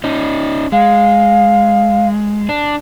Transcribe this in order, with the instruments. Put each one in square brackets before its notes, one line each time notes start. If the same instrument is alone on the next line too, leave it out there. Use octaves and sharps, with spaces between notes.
[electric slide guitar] C#4 D#4
[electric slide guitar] G#3 [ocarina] F5
[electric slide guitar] D4